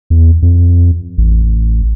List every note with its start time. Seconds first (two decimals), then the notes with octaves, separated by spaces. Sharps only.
0.10 E2
0.42 F2
1.18 A1